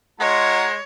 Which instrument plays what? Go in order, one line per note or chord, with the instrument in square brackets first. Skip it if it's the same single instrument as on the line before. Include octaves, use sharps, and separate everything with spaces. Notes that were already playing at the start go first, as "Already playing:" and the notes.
[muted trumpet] G#3 [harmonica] F4 F#5 A#5 [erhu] C#5 [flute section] D#5 C6